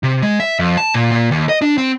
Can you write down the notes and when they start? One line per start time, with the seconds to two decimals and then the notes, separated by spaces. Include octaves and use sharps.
0.03 C3
0.22 G#3
0.40 E5
0.59 F2
0.77 A5
0.94 A#2
1.12 A#2
1.31 D#2
1.49 D#5
1.62 D4
1.78 C4